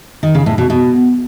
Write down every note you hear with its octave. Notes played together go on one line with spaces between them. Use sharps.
D#3
C#3
A2
B2
B2